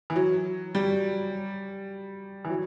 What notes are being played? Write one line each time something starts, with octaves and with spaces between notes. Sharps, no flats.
E3
F#3
G3
E3
F#3